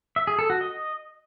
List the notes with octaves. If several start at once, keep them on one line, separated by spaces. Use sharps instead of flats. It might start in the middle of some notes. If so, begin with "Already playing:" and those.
E5
G#4
A4
F#4
D#5